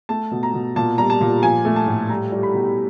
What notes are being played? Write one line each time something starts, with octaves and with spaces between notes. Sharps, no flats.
A3 A5
B2
A#5
B2
A#2 A5
G3 A#5
A5
A#2
F3 G#5
A3
A5
A2
G3 A#5
G3
B5
B2